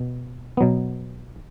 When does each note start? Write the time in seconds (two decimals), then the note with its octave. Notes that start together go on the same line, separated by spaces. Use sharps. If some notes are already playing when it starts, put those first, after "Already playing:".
Already playing: B2
0.57 B2 F#3 B3